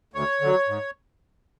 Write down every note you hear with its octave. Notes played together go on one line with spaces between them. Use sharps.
D2 C#5
D3 F#3
G#2